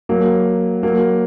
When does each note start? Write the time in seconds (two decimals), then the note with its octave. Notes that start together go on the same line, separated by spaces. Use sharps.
0.09 F#3 A#3
0.83 F#3 A#3